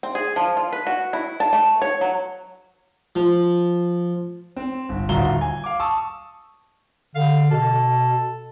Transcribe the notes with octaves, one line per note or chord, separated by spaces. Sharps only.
C4
G#4
F3
F4
B4
F#4
E4
A5
A3
C#5
F#3
F3
C4
G1
D#1 D2 F#4 F5 A#5 G7
G#5
F5 D6
A5 C#6 D#6 E6
D3 F5
B2 A4